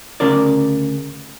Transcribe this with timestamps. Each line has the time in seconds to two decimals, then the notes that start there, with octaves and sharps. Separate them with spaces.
0.20 D2 C#3 A#4 D5